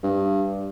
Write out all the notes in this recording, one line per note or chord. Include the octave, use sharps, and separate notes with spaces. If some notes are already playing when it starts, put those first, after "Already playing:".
G2